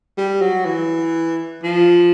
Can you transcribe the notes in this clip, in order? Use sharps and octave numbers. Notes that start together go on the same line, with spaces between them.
G3
F#3
E3
F3